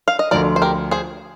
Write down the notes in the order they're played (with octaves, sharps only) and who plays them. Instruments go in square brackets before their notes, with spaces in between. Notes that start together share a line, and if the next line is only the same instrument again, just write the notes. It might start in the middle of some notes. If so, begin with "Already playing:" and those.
[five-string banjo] F5
D#5
[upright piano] D2 D3 F3 [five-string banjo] A#4 D5
[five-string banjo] C5
G4 A#4
G#4 C5